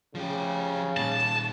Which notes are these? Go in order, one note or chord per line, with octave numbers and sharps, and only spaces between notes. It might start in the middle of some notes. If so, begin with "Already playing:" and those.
C#3 F3 G4
A#2 G3 A5